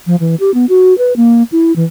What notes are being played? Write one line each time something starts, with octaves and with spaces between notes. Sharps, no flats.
F3
E3
G4
B3
F#4
B4
A#3
E4
E3